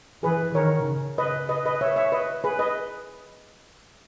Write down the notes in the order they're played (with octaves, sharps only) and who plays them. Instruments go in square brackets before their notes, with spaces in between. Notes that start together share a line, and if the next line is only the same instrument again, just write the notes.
[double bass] E3 [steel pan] G#4 B4
[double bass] D#3 [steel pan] A#4 C#5
[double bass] C#3
[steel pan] B4 D#5
B4 D#5
B4 D#5
C#5 E5
C#5 E5
B4 D#5
G#4 B4
B4 D#5